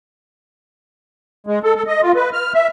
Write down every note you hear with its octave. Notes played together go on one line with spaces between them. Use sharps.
G#3
A4
A4
D#5
F4
B4
F6
E5